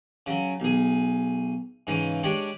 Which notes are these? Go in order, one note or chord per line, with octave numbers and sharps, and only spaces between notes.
C#3 F#3
B1 G#4
G#2 C#3 E3
G#3 D4 G4 C#5 D5